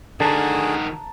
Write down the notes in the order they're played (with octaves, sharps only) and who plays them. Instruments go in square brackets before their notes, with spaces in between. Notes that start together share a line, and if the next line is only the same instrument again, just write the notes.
[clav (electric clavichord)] D3 [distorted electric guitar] D#3 F#4 [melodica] G#4 [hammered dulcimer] A5 A#5